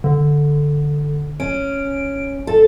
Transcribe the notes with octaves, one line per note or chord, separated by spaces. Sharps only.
D3
C#4 D7
A4